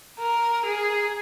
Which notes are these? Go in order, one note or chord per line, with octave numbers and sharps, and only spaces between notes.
A#4
G#4